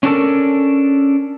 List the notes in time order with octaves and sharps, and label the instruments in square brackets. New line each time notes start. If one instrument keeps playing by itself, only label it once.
[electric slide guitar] C#4 D4 F4 F#4 A4 A#4